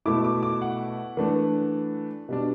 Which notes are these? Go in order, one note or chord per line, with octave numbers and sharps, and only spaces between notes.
B2 A3 E4 D6
D6
D6
F#5
E3 A3 D4
B2 G3 D4